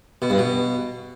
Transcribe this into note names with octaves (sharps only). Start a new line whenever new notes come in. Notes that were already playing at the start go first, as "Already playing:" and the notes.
B2
G2
B2